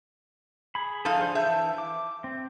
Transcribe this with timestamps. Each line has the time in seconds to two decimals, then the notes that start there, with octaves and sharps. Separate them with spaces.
0.75 G#4 B5
1.05 F3 D#4 A4 F5
1.17 D4 G#4 C5
1.35 E3 E5 A5 G6
1.78 D6
2.24 C4